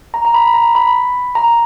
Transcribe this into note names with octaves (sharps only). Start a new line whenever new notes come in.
A#5
A#5
B5
A#5
B5
A#5